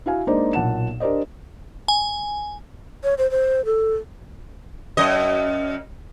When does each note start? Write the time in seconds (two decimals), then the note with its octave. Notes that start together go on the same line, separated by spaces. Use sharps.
0.06 E4 F#4 F5 G#5
0.27 G#3 A#3 D4 D#4 C5 D5
0.53 B1 A#2 F#5 A5 E7
1.00 D4 G4 A#4 C5 D5 D#5
1.88 G#5
3.04 C#5
3.18 C5
3.31 C5
3.65 A4
4.97 F#2 D#5